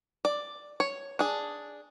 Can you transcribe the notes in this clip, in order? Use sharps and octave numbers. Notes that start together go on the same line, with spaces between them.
D5
C#5
D4 G#4